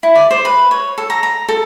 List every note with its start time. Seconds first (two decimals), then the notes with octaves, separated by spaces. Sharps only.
0.03 E4
0.15 D5
0.31 C5
0.45 B4
0.71 C#5
0.98 A4
1.10 A#5
1.23 A#5
1.49 A4